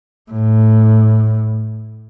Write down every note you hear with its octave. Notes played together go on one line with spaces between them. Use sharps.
A2